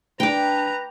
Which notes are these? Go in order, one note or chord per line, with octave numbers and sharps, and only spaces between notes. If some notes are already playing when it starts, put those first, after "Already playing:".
D4 B4 G5 A#5 D6